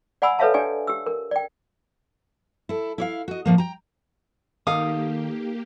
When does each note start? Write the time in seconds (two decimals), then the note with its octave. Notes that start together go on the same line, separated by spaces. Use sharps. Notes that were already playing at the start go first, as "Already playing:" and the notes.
0.22 D5 F#5 G#5 B5 E6
0.39 A4 B4 C#5 E5 F5 A5
0.54 D4 G4 D5 G#5
0.87 G4 E6
1.06 A#4
1.31 D5 G5
2.69 E4 A4
2.98 E4 C#5 F5
3.28 F#4 D#5
3.46 A2 F3 A#3
3.58 G5 A#5
4.67 D#3 A#3 D#4 G4 A4 F5 D#6